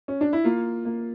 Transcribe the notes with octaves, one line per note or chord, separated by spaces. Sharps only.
C#4
D4
E4
A#3 F4
A#3